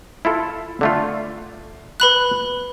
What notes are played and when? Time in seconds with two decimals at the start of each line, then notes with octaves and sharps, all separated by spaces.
0.25 E4 F4 A4
0.81 D3 A3 F4
2.00 B4 B5 F#6